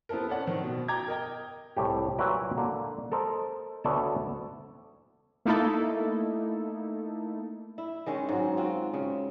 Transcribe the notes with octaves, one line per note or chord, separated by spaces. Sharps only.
B3 C4 E4 A4 A#4
C#4 A4 D5 F#5
D#3 C4
B2
G5 A#5 D6 G#6
A#4 D#5 G5
C2 A2 G4
A#2 F#3 E4 A#4 B4 G5
D3 A#3
A4 A#4 C5 D#5
D2 B3 A4 C#5 D5 A5
A3 A#3 D#4 E4 A4
E4
D#3 G#3 C#4
G#2 F#3
C4 F4 F#4
C#3